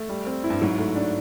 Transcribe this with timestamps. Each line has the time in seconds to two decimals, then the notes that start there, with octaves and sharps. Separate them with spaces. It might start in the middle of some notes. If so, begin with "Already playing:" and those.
Already playing: A3
0.09 G3
0.27 C4
0.44 E4
0.50 G2
0.61 G#2 F#3
0.79 A3
0.96 D4